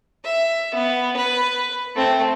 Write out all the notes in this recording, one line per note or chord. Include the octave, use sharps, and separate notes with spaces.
E5
B3
B4
A3 C4